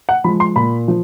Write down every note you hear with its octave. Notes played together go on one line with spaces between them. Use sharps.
F#5
F3 G#3 B5
C6
A#2 B5
F3